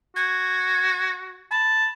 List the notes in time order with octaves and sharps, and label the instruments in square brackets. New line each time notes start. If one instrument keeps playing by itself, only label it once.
[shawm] F#4 [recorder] G#6
[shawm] A5 [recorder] B5